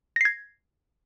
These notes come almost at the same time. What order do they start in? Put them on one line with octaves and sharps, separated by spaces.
A#6 C7 G#6